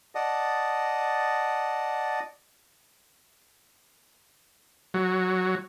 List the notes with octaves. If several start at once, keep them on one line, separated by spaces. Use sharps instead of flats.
D5 D#5 F#5 A5 D#6
F#3